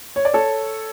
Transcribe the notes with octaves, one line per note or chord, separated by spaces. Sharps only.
C#5
D5
A4 C#5